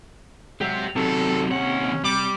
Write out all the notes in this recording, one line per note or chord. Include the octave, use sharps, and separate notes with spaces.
F#3 G#3 G4 E5
C3 D#3 F#3 A4
D#2 C#4 F#5
G3 D6